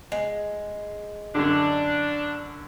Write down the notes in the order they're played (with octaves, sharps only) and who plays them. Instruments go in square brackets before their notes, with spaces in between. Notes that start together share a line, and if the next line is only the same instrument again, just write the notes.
[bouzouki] G#3
[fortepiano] F#2 D3 [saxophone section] D4